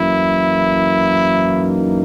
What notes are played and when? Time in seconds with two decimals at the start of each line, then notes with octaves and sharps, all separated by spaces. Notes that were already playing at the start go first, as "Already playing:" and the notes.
Already playing: F#2 E3 A#3 E4
1.59 D#4